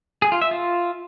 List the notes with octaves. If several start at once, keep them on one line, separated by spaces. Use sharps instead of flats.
G#4
F4
E5
F4